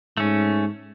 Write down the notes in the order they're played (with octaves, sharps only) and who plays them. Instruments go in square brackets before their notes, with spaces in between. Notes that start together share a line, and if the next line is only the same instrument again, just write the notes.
[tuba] G#2 [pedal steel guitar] A3 C#4